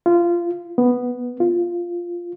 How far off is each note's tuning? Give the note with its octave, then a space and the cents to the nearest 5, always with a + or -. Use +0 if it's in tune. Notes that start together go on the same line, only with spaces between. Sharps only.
F4 -20
B3 +0
F4 -5